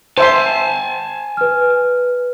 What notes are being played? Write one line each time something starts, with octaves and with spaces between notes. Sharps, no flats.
C5 E5 G#5 A5 C6
B4 F6